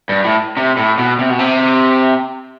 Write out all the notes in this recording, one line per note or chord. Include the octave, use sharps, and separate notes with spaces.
G2
A2
C3
A2
B2
C3
B2
C3